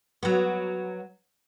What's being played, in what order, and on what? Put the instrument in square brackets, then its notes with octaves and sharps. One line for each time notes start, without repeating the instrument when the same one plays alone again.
[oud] F#3 B3